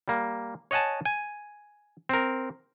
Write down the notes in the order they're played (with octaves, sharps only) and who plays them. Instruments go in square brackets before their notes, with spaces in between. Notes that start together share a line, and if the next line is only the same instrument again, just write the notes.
[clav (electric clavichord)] G3 A#3
C#5 D#5 F#5 G#5 A5
G#5
C4 A#4